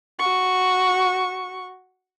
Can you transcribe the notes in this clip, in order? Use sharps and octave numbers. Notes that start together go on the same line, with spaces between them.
F#4 C#6